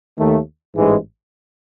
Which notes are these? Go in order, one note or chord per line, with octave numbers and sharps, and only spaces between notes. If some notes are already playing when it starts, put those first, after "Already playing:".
D#2 D#3 A3
A1 G#2 E3 G#3